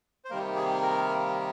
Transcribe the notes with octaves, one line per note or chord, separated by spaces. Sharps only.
C5
C3 D#3 G3 A#3 A#4
G#4
A#4